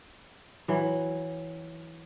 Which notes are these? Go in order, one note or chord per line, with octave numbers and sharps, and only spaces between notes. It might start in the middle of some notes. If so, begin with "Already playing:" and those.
E3 F#3